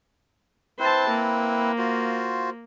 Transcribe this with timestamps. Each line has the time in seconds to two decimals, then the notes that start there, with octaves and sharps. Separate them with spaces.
0.79 C4 E4 B4 C5 A5
1.10 A#3
1.78 F4 F#4 C5